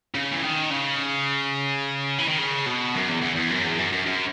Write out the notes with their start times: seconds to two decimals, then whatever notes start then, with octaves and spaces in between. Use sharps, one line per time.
0.14 C#3
0.31 E3
0.42 D#3
0.70 C#3
2.18 E3
2.28 D#3
2.38 C#3
2.66 B2
2.94 F#2
3.08 E2
3.22 E2
3.36 E2
3.50 F#2
3.64 E2
3.78 F#2
3.92 F#2
4.06 F#2